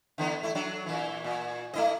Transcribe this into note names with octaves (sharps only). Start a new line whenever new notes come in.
D3 E3 B3
A3 E4
F#3 D4
A#2 E3
A#2
A3 E4 D#5